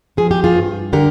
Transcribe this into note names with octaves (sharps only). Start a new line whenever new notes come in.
F3 G#4
G4
F4 G#4
G2
D3 G4 A#4